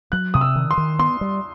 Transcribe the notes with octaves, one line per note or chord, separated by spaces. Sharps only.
F#3 F#6
C3 D#6
E6
D#3
C6
D#3
B3 C6
G3